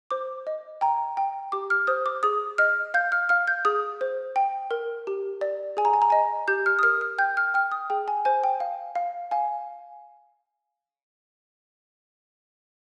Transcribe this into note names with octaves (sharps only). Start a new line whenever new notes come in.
C5 D6
D#5
G5 A#5
G5
G4 D6
F6
C5 D#6
D6
G#4 D#6
D#5 F6
F5 G6
F6
F5 F6
G6
G#4 D#6
C5
G5
A#4
G4
D5
G#4 G#5
A#5
G#5
A#5
D#5 G#5
G4 G6
F6
D#6
A#4 F6
F6
G5 G6
F6
G5 F6
D#6
G#4 G5
G#5
C5 G#5
G5
F5
F5
F5 G#5